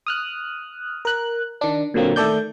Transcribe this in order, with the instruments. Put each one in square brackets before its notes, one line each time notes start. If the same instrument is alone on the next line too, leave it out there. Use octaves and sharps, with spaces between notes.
[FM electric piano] D#6 F6 F#6
A#4 F#6
D#3 D4
A#2 D3 F#3 A#3 C4
D#3 A3 A4 D5 G6